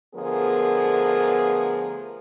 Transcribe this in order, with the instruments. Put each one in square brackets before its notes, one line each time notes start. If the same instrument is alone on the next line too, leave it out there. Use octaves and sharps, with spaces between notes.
[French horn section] D3 F3 A3 B3 G#4 A#4